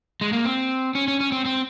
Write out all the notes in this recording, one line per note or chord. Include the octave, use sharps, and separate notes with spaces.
G#3
A#3
C4
C#4
C#4
C#4
C4
C4